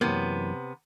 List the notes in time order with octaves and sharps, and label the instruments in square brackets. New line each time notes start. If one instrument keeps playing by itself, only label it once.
[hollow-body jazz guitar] F#2 E3 A#3 [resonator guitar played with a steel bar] C3 B3